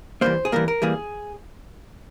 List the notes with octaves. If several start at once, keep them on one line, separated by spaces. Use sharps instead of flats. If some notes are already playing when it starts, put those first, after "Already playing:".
E3 G3 A#3 C5
G#4
E3 G3 A#3 A#4
A#4
E3 G3 A#3 G#4